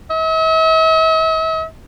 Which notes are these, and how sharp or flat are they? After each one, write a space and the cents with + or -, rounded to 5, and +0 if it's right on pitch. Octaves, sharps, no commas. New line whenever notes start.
E5 -45